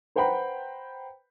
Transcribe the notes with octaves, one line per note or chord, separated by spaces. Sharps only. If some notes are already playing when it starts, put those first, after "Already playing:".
B4 C5 F#5 G5 A#5 B5